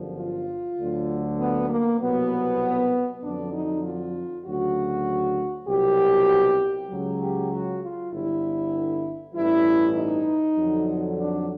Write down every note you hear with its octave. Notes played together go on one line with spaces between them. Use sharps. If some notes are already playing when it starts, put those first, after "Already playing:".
Already playing: G1 F#2 D3 F3
F4
D2 D3 F#3
B3
A#3
C2 B2 F#3 B3
F2 D3 F#3 D4
D#4
F4
D2 C#3 F#3 F#4
C2 B2 F#3 G4
C#2 C#3 F#3
G4
F#4
F4
G1 G2 D3 E4
A1 G2 E3 E4
D#4
F2 D3 F#3
D4